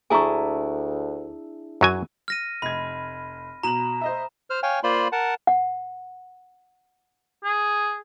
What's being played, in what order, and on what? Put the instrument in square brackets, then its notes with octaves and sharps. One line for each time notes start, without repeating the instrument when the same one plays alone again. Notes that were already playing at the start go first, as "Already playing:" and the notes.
[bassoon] D2 [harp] D4 E4 G#4 [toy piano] G#5 A#5 C#6
[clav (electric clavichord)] F#2 F#3 G#5
[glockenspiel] F6 A#6 D#7
[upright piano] F1 G#6 [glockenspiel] B5
[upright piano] B2 F#7 [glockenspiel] A#5 E7
[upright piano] C5 D#5 E5
[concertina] C5 F6
C#5 F5 G5 G#5
A#3 F4 C5 D5 B5 C6
A#4 F#5 A5
[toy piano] F#5
[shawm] G#4